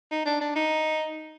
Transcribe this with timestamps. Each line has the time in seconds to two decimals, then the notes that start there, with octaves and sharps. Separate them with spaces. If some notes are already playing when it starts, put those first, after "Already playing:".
0.11 D#4
0.26 D4
0.41 D4
0.56 D#4